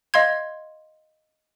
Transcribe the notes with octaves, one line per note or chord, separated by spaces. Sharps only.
D#5 F5 C6 G#6